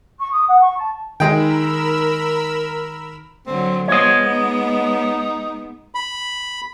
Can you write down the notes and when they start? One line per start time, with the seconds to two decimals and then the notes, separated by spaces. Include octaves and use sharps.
0.19 C#6
0.32 D#6
0.48 F#5
0.61 C#6
0.77 A5
1.20 D#3 G#3 A#4 G5 B5 E6
3.47 D3 F#3 C4
3.88 F3 G#3 B3 C#5 D#5
4.32 D#4
5.95 B5